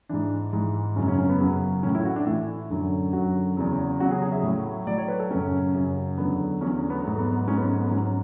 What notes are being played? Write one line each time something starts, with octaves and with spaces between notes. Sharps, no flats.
G#2 E3 D4
G#2 E3
F#2 C#3 F#3 C#4
C#4
C#4
B3
F#2 C#3 F#3
A2 E3 C#4
E4
F#4
D4
A2 E3 E4
F#2 D3 F#3
F#2 D3 F#3 F#4
E2 C#3 F#3
E2 C#3 F#3 F#4
G#4
G#4
E5
A2 F#3
A2 F#3 D5
C#5
B4
A4
F#2 C#3 F#3 C#4
F#2 C#3 F#3
E2 D3 F#3 B3
E2 D3 F#3 C#4
B3
G#2 F#3 A3
B3
B3
G#2 F#3 C#4
B3
A3
B3
G#2 F#3 C#4